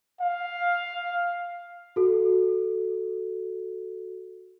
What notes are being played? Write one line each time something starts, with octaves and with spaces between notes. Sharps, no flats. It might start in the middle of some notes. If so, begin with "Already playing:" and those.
F5
F#4 A4